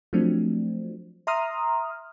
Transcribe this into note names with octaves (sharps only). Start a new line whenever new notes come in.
F3 F#3 A3 C4 D4
E5 A#5 C6 D#6 F6